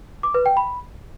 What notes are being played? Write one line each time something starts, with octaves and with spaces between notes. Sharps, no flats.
D6
B4
G5
B5